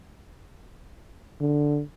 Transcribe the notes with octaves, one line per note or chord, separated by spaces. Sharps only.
D3